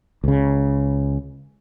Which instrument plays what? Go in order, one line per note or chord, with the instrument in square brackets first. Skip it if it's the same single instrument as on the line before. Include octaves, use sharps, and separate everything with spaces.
[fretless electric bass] C#2 C#3